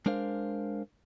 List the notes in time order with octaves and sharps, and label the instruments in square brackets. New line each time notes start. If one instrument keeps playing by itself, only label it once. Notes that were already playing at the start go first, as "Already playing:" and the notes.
[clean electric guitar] G#3 D4 A#4 C5 F5